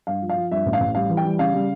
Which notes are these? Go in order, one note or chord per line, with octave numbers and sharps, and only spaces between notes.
G2 F5
F3
F5
F3
G2 E5
A1
F5
A1
G3 F5
E3
G5
G3
C#3 F5
G3